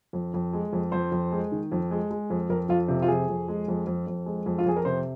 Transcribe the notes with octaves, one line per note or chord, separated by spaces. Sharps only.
F2
F2
G#3
F2
F2 C5
F2
G#3
D#3
F2
G#3
G#3
F2
F2 A#4
F2 F4
C3 F4
F4
F2 G#4
F2
G#3
F2
F2
F2
G#3
F2
F4
F2 G#4
A#4
C3 C5